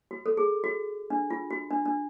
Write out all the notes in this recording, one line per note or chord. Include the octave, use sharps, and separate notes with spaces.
F#4
A4
G#4
F#4
D4
F4
F#4
D4
D4